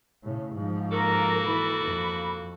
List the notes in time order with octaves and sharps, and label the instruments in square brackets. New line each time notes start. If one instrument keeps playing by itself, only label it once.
[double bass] A2 C#3
G#2 F3
[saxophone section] A#3 F#4 A4 [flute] A#4
[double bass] E3 [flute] B5
[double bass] F2